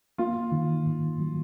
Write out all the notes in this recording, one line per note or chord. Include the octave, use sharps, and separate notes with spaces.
A#3 F4
D#3
G#2
F#3